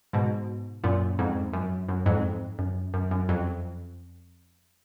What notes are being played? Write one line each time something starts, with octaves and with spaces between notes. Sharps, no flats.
G#2 B2
F#2 A#2
F2 G#2
F#2
F#2
F2 G#2
F#2
F#2
F#2
F2